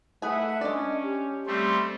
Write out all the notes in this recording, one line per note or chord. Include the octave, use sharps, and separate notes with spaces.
A3 G#4 B4 E5 F#5 G#5
G#3 C#4 D4 D5
G4
G3 A3 C4 C6